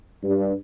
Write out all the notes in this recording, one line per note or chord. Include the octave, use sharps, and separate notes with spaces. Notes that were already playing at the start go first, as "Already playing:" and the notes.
G2